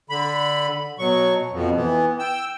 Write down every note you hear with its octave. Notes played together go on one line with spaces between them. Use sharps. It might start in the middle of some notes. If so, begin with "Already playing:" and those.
D3 B5
B2 F#3 C#6
F2 B2
E3 B3
G5 E6